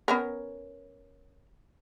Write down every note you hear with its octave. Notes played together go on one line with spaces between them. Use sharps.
B3 C#4 A#4